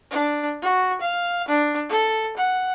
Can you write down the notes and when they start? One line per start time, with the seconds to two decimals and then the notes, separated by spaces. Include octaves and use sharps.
0.11 D4
0.62 F#4
1.01 F5
1.48 D4
1.89 A4
2.37 F#5